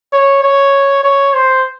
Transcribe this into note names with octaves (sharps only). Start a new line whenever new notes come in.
C#5
C#5
C#5
C5